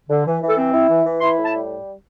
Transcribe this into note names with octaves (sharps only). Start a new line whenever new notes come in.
D3
E3
E3
A4
C4
E4
E3
E3
E4 C6
A2
A5
G3